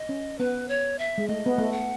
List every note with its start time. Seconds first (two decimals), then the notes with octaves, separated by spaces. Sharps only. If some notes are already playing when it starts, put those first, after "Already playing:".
Already playing: D#5
0.09 C#4
0.39 B3 B4
0.69 C#5
0.99 E5
1.18 G#3
1.28 A3 D#5
1.46 B3
1.58 A3
1.72 F#5